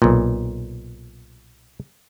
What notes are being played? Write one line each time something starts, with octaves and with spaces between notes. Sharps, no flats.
B1 A#2